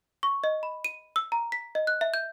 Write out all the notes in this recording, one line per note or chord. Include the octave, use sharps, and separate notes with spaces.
C#6
D#5
B5
D#7
E6
A#5
B6
D#5
F#6
E5
G6